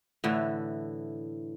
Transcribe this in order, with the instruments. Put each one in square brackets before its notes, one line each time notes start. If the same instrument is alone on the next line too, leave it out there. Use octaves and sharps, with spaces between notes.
[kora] A2 D3 E3